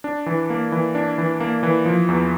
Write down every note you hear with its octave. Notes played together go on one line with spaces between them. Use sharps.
D4
E3
A#3
E3
D4
E3
A#3
E3
F3
E2